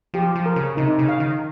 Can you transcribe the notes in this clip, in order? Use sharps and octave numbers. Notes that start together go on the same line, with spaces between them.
F3 G4
F3
A#4
C#3
C3 D#4
C#3
F5
D#3